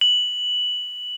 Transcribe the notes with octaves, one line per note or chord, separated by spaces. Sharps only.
F#7